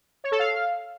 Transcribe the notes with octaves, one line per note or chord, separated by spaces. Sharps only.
C#5
A4
F5